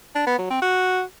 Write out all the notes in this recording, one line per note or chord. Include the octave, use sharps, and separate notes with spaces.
D4
B3
F#3
C4
F#4